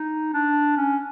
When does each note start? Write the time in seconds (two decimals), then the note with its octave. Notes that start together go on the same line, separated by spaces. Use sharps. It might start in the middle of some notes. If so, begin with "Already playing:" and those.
Already playing: D#4
0.34 D4
0.77 C#4